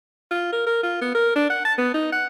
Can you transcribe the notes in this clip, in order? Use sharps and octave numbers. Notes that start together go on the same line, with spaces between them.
F4
A#4
A#4
F4
B3
A#4
D4
F#5
A5
B3
D#4
F#5